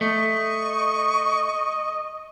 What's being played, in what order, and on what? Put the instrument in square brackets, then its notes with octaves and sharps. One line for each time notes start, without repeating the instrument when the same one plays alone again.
[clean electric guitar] A3 [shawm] D#5 [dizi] C#6